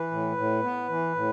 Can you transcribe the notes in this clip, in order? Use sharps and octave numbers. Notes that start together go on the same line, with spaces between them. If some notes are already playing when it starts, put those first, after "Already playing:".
Already playing: E3 B4
A2
A2
B3
E3
A2